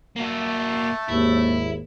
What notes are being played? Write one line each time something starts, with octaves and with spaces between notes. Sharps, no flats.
A3 A#3 F#4
G#1 D#2 E4